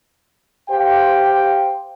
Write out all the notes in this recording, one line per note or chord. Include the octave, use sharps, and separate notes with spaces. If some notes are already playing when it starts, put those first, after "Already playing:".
G4 C5 F5 G5